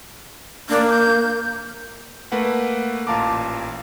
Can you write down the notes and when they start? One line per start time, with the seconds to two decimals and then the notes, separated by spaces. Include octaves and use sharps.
0.69 A#3 D4
0.90 G6
2.32 A3 A#3 B4 F#5
3.07 A1 A#2 F5 A5 A#5 D6